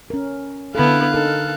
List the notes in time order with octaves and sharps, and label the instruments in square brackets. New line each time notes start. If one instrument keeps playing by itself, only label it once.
[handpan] C#4 A#4
[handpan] D3 A4 [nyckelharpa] B3 E4 [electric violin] F5 F#6
[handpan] D#4 A#4 [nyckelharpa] A4